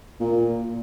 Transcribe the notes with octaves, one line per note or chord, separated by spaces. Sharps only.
A#2